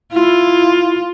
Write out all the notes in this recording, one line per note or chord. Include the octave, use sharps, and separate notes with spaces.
E4 F4